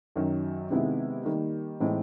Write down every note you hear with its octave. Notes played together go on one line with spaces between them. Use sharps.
F#2 D#3 F#3
C3 D#3 G#3 B3 E4
D#3 G3 A#3 D#4
A2 E3 G#3 C4 D#4